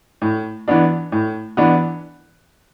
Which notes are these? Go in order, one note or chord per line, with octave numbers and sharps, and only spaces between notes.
A2
E3 B3 D4
A2
E3 B3 D4